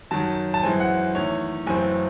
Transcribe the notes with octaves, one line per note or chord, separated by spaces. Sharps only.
F#2 D#3 F#3 A5
A5
F#2 E3 G#3 C4 G#5
F#5
E2 D#3 A3 C#5
F#1 F#2 E3 A3 C4 G#5